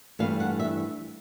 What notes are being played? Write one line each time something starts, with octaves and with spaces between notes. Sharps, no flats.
G2 E3 A3 F5
F#5
E5